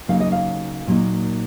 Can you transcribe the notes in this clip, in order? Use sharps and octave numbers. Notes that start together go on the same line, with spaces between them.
C#3 F#3 A#3 D#4 F5
D#5
F5
A#2 F#3 A#3 D#4